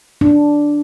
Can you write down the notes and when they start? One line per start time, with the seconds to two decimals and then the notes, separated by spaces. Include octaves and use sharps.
0.21 D4